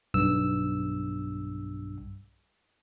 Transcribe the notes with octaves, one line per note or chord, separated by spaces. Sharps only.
B1 G2 E6